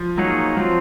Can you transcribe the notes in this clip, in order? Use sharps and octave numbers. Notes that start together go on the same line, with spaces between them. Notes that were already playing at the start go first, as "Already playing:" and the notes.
Already playing: F3
F#3 A#3 D#4 G#4 C#5
F3 F#3 C4 F4